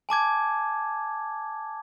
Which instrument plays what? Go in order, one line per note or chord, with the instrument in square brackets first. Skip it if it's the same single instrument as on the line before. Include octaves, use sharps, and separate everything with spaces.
[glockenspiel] G#5 A5 D6 G#6